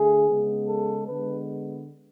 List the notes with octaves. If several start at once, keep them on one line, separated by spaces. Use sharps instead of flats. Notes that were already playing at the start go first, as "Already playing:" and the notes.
Already playing: D3 A3 G#4
C#3 G#3 B3
A4
D3 G#3 B3 B4